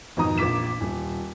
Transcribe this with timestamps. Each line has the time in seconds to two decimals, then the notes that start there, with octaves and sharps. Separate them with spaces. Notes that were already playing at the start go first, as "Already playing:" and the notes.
0.17 G#1 F2 B2 D#4 A#5 D#6
0.38 A#1 F4 D6 B6 E7
0.81 D#1